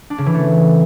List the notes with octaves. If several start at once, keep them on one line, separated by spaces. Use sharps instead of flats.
D4
C#3
E3
A3